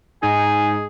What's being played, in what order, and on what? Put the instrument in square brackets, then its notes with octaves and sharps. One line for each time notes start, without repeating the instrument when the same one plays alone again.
[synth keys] G#2 D#4 [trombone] G#4 [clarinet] G#5